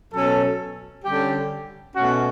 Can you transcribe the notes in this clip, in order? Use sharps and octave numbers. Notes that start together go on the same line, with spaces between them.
B2 F#3 C#4 A4
D3 G3 C#4 G4
B2 A3 C#4 F#4